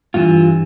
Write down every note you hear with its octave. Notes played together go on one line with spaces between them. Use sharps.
G2 E3 F4